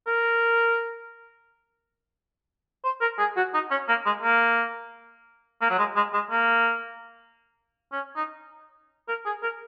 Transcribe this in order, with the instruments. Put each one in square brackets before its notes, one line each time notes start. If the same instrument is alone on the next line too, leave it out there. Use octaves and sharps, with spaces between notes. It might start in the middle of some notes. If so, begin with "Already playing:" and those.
[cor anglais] A#4
C5
A#4
G#4
F#4
D#4
C#4
A#3
G#3
A#3
A#3
F#3
G#3
G#3
G#3
A#3
C#4
D#4
A#4
G#4
A#4